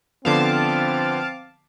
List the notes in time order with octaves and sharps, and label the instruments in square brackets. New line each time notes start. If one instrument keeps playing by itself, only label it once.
[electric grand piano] D3 F3 B3 [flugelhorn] C4 [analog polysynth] F5 A5 D6